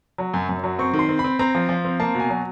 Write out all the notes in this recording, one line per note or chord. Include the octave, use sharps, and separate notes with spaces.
F#3
F#2
F#2
F#3
C4 C#6
D#3
C6
C4
B5
C4
C4 A#5
F3
F3
C4
A#3 A5
B2 G#5
F#3